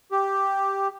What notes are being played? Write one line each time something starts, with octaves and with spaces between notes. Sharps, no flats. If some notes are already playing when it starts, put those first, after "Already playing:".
G4